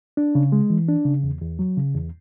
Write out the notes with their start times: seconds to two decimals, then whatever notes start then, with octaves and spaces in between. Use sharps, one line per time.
0.17 D4
0.35 C#3
0.52 G#3
0.70 E3
0.88 D4
1.05 C#3
1.23 E2
1.41 E2
1.59 F#3
1.77 C#3
1.95 E2